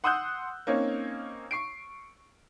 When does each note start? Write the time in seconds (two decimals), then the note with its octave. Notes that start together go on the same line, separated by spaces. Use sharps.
0.04 F#5 C6 D#6 E6 F#6 G6
0.67 A#3 C4 C#4 D#4 C#5
1.51 C#6 C7 D7